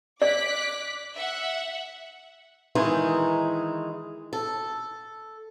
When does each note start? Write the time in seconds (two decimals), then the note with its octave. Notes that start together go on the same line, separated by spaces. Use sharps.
0.22 D5 D6 F#6 B6
1.16 E5 F#5
2.75 D#3 E3 G#3 D#4
4.33 A4